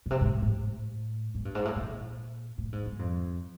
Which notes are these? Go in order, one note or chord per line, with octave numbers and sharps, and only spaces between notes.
B2
C3
G#2
A2
G#2
G2
G#2
A2
A#2
A2
G#2
G2
F2